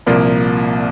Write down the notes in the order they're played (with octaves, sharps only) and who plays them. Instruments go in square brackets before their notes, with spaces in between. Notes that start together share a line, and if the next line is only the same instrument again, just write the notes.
[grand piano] C2 A#2 F3 A#3